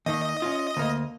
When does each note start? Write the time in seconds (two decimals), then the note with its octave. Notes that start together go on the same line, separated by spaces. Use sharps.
0.06 D#2 D#3 D#5
0.42 C#4 F4
0.77 D2 A#3